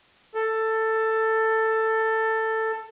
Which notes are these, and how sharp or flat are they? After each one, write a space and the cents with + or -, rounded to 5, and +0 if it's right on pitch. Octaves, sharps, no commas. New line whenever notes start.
A4 +10